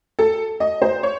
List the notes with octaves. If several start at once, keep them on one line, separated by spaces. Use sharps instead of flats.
A4
D#5
C5
C#5